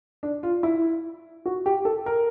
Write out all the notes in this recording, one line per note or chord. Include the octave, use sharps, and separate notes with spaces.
D4
F4
E4
F#4
G4
A4
A#4